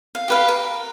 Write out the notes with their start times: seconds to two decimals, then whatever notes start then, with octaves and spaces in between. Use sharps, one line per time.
0.15 F5
0.28 G4 B4 F5
0.48 A#4